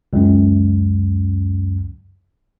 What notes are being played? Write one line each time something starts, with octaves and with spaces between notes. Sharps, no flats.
C#2 F#2